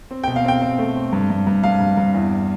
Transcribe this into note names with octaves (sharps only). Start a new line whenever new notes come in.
C4
G5
B2
F5
C4 G5
C4
A3
C4
G2
G2
G2
G2 F5
G2
G2
E2